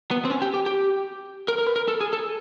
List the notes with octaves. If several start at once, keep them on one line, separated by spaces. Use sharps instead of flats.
B3
C4
C#4
G4
G4
G4
A#4
A#4
B4
A#4
A4
G#4
A4